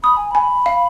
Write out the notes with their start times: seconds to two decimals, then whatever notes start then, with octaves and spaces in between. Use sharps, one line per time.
0.03 B5 D#6
0.17 G#5
0.31 G#5 B5
0.66 F5